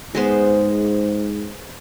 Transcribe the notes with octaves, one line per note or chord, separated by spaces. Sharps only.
G#2 G#3 B3 C5